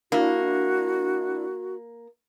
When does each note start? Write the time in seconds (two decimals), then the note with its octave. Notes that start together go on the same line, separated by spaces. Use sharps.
0.12 A#3 D4 E4 F#4